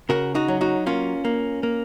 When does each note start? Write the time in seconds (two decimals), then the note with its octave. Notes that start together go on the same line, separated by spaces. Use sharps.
0.09 C#3 F#4 A#4
0.35 D#4 F#4
0.48 F#3
0.61 D#4 F#4
0.86 A#3 C#4 F4
1.25 A#3
1.63 A#3